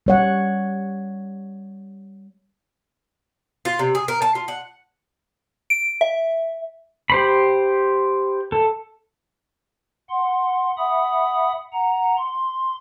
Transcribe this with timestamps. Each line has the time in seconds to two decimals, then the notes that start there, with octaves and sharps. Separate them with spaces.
0.06 G3 C#5 F#5
3.65 F4
3.79 C3
3.95 G#4
4.08 A#4
4.22 A5
4.35 F4
4.48 F#5
5.70 D7
6.01 E5
7.10 G4 C5 B5
8.52 A4
10.09 F#5 C6
10.77 E5 F#5 B5 D#6
11.73 F#5 A#5
12.17 C6